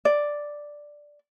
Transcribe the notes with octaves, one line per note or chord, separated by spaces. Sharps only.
D5